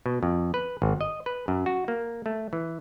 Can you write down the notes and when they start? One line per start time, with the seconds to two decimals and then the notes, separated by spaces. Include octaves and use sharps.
0.06 B2
0.23 F2
0.54 B4
0.82 G#1
1.01 D#5
1.26 B4
1.48 F#2
1.66 F#4
1.88 A#3
2.26 A3
2.53 E3